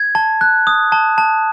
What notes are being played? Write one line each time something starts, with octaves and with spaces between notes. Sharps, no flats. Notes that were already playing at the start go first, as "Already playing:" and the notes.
Already playing: G#6
A5
F#6
D#6
A5
A5